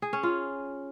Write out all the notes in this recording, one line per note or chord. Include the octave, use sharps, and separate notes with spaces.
G#4
C#4
F4